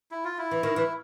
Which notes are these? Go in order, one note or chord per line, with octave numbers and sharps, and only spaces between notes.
E4
F4
E4
E3
D#3
E3